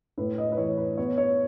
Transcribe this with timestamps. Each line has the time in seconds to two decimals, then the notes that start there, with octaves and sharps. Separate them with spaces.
0.18 A2 B4
0.38 D#5
0.52 B4
0.58 E3 C#5
0.77 B4
0.97 B3 C#5
1.18 C#5